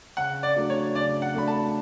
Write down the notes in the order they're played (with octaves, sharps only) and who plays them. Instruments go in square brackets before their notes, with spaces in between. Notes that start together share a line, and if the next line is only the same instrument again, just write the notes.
[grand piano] C#3 [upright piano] F#5
[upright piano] D5
[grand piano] F#3 A3 D4
[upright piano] C#5
[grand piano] C#3 [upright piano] D5
[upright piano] F#5
[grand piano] F#3 A3 D4 [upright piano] B5
[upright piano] A5